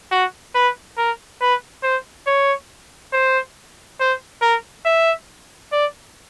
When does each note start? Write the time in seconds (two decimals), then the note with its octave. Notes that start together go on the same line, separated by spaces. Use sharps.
0.11 F#4
0.55 B4
0.98 A#4
1.41 B4
1.83 C5
2.27 C#5
3.13 C5
4.00 C5
4.42 A#4
4.86 E5
5.72 D5